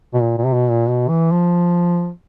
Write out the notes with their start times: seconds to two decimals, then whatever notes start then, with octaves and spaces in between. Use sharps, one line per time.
0.14 B2
0.21 A#2
0.38 A#2
0.45 C3
0.53 B2
0.70 A#2
0.88 B2
1.09 E3
1.31 F3